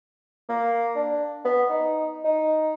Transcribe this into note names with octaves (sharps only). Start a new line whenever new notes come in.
A#3
D4
B3
D#4
D#4